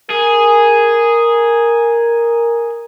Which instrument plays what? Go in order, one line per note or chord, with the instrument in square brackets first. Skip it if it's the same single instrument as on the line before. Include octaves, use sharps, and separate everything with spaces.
[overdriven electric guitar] G#4 [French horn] A#4